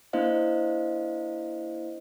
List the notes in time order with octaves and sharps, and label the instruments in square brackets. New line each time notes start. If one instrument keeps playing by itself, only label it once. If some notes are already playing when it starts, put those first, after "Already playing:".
[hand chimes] A#3 D4 E4 C5 D#5 F5